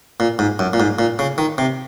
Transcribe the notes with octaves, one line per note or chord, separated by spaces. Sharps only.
A#2
G#2
F#2
A#2
G#2
A#2
C#3
D#3
C3